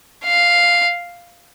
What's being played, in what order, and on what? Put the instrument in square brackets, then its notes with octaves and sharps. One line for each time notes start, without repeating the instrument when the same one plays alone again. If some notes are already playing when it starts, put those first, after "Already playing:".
[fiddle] F5